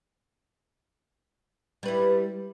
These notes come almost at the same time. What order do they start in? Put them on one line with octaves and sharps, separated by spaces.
G3 B4 E4